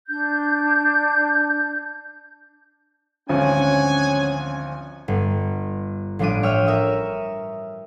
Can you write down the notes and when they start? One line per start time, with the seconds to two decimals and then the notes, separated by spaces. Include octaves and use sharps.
0.07 D4 G6
3.29 G#1 D2 F3 C#4 C#5 F#5 G#5
5.08 G1
6.19 A1 F3 G3 D4 D6 D#7
6.43 C#5 E5 G5 E6 F6
6.66 A#4 E5 D#6 E6